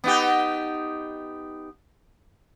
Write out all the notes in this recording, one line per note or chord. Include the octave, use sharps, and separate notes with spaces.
B3 D#4 G4